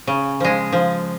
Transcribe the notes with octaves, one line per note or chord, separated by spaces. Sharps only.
C#3
F3 G#3
F3